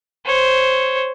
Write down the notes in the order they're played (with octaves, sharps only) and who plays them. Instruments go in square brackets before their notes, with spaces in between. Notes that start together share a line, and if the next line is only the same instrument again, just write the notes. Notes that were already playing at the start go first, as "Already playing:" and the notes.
[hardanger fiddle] C5 C#5